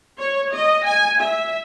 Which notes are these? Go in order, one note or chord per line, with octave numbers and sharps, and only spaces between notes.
C#5
D#5
G#5
E5